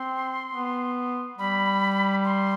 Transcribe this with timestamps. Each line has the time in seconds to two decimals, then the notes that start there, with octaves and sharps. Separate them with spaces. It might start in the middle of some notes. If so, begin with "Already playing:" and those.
Already playing: C4 C6
0.53 B3
1.38 G3 B5
2.25 C6